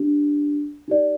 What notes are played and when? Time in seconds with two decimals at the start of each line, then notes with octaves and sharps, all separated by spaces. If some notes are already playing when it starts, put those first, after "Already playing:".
Already playing: D4 G4
0.88 D#4 G4 D5